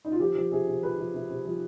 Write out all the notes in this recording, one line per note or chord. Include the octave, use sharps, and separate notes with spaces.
D#4
F4
F3 G4
F3
C3 G#4
C3
F3 B4
F3
C3
C3
F3